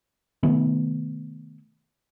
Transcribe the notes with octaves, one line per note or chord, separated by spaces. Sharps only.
C3 D#3 A3 B3